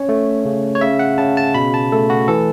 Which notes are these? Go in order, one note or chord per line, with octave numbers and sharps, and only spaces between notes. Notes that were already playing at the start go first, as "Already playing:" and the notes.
Already playing: C#4 C#5
A3
C#3
C#5
C#3 E5
F#5
C#3 A5
A5
B2 B5
A5
A3 A4
F#4
E3 A4